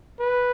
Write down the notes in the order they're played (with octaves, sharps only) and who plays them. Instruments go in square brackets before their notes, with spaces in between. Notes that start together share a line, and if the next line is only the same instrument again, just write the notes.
[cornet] B4